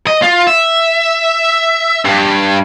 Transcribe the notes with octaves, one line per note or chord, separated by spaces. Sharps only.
D#5
F4
E5
G2